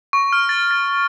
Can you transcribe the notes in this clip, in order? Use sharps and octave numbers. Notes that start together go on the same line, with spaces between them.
C#6
F6
A6
A6